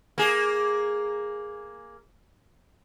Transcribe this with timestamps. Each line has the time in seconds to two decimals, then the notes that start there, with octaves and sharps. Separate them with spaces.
0.18 A#3 G#4